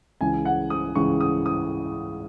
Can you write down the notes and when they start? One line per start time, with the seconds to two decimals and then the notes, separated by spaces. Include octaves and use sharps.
0.21 C#2 C#3 E3 G#5
0.45 F#5
0.70 D#6
0.95 C#2 C#3 E3 C#6
1.21 D#6
1.46 D#6